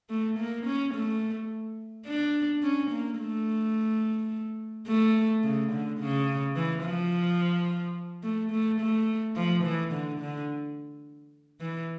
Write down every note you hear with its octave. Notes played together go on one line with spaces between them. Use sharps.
A3
A#3
C#4
A3
D4
C#4
A#3
A3
A3
C#3
D3
C#3
E3
F3
A3
A3
A3
F3
E3
D3
D3
E3